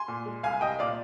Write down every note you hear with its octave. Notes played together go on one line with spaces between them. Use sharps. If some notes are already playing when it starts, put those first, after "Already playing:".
Already playing: G#5 C6
A#2
G#3
C2 F5 G#5
C2 D#5 G5
A#2 D5 F5